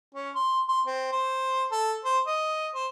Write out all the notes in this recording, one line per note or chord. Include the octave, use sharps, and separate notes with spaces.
C#4
C6
C6
C4
C5
A4
C5
D#5
C5